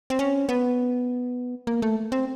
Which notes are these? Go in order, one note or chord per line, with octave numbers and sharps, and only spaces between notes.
C4
C#4
B3
A#3
A3
C4